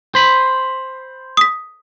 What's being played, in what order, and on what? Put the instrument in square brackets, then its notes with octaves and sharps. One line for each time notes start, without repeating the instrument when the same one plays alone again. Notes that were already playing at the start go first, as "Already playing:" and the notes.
[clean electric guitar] C5 B5
[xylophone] D#6 B6